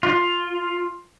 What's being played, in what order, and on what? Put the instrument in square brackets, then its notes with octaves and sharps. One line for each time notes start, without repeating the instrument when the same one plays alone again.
[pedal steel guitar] F4